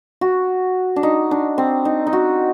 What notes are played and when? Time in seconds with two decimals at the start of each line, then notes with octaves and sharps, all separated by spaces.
0.21 F#4
0.96 D4
1.03 D#4
1.31 D4
1.58 C4
1.85 D#4
2.07 D#4
2.13 F#4